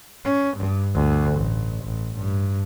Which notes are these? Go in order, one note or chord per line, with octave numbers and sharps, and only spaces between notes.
C#4
G2
D2
A1
A1
G2